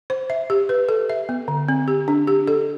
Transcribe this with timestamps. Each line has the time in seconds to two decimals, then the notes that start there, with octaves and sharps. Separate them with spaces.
0.10 C5
0.30 E5
0.50 G4
0.69 B4
0.89 A4
1.09 E5
1.29 B3
1.48 D3
1.68 C4
1.88 G4
2.08 D4
2.27 G4
2.47 A4